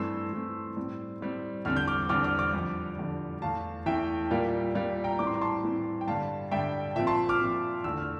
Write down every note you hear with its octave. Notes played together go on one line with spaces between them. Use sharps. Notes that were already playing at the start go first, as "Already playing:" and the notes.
Already playing: G2 E3 A3 C4 C6 E6
G2 E3 A3 C4
A2 G3 C4
A2 G3 C4
E2 D3 G3 C4 F6
G6
D6 F6
E2 D3 G3 C4 D6 F6
D6 F6
D6 F6
F2 D3 G3
F2 D3 G3
E2 E3 A3 F5 A5
E2 E3 A3 E5 G5
A#2 G3 A#3
A#2 G3 A#3
G5 A#5
A2 E3 G3 C4 D6
C6
A#5
A5 C6
A2 E3 G3 C4
G5
G2 D3 G3 F5 A5
G2 D3 G3 E5 G5
A#2 F3 C4 E5
A5 C6
D6 F6
A#2 F3 C4
E2 D3 A3 E6
F6